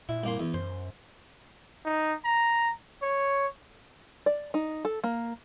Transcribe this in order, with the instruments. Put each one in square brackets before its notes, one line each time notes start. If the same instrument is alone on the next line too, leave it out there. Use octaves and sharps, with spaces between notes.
[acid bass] A#2 [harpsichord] E4
[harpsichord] C2 A#3 C6
E2
[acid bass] F#2 [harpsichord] C5
[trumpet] D#4
A#5
C#5
[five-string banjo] D5
D#4
A4
A#3